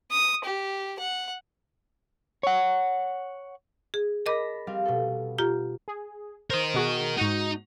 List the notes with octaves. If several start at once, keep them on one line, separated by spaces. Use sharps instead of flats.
D#6
G4
F#5
C#5 F#5
G#4
A#4 D#5 A5 B5 D6 A#6
G3 C4 F5
B2 A4
F4 G4 A#5
G#4
A#4 C5 D#5
B2 F#4 G#4
G#2 D#4 F#4